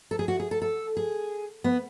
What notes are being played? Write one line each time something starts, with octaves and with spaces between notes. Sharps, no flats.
A4
G#4
F#4
G#4
A4
A4
G#4
B3